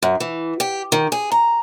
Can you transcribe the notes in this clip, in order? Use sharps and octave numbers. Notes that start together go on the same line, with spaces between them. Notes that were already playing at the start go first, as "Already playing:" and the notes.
F#2
E3
G4
D#3
G#4
A#5